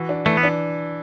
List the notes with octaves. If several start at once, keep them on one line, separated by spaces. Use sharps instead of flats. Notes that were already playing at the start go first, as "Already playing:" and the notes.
Already playing: E3 F#4
D4
E3 A3
B3
D4